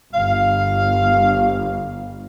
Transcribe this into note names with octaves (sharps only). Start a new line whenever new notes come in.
G1 F5